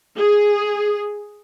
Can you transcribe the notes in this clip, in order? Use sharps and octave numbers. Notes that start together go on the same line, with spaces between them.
G#4